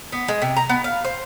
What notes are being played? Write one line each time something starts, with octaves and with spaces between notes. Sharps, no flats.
B3
G#3
C3
A#5
B3
F5
C5